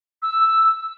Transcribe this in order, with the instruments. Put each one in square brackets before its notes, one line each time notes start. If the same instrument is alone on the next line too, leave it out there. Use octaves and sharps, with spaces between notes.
[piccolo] E6